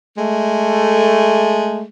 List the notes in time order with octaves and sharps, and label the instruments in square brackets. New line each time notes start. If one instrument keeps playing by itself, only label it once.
[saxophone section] G#3 A3